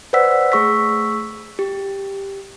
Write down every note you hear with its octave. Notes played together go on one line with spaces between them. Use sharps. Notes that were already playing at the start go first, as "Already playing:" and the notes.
B4 C5 D5 F#5 E6 B6
A3 G#4 C#6 E6 B6
G4